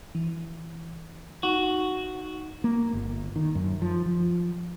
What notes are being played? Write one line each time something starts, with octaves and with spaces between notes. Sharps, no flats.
E3
D#4 F#4
A#3
G1
D#3
F#2
F3
F3